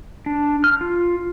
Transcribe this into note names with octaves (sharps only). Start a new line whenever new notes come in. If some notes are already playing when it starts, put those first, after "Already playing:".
D4
F6
F4